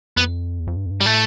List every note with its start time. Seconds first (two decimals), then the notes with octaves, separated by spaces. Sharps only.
0.17 F2 B3
0.60 E2
0.67 F2
0.76 G2
0.86 F2
0.90 G2
1.01 G3
1.05 A2 A3